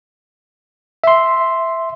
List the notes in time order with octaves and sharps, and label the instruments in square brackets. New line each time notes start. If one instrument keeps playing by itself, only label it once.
[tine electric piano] E5 C6